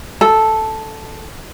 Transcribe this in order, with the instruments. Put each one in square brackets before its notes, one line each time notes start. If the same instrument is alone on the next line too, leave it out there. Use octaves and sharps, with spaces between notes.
[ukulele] A4